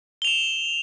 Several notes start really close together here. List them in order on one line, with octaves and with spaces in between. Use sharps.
G7 F7 E7